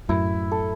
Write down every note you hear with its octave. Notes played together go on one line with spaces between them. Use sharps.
F#2 A2 E4
A4